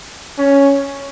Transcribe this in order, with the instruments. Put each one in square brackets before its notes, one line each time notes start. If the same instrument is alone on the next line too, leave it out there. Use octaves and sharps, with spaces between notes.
[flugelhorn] C#4